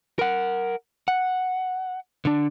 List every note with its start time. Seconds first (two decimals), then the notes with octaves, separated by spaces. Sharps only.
0.19 A#4 F#5
1.08 F#5
2.25 D3 D4